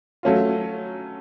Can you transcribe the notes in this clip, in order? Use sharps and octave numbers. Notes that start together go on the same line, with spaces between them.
F#3 A3 C#4 F4